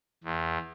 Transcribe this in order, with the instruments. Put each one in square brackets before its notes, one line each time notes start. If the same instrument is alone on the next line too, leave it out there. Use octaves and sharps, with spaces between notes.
[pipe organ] E2